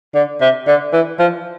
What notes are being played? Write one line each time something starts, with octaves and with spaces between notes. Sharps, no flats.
D3
C3
D3
E3
F3